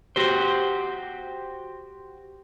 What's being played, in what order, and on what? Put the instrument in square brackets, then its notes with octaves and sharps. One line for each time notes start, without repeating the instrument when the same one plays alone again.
[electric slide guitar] F#4 G4 C5